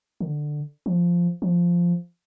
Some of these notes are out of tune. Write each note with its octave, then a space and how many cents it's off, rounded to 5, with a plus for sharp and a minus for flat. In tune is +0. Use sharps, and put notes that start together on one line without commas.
D3 +15
F3 -5
F3 -5